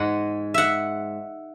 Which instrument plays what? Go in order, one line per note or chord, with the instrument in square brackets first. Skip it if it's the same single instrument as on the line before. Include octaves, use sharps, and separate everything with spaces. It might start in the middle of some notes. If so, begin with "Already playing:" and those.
Already playing: [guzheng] G#2 G#3 F#5
E5 F#5